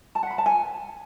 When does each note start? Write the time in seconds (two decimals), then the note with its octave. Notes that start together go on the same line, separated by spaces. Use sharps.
0.15 A5
0.23 F#5
0.31 B5
0.38 A5
0.46 G#5